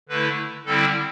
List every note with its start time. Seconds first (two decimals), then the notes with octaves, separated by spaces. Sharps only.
0.09 D3 A3 E4 B4
0.66 D3 G3 C4 E4 A4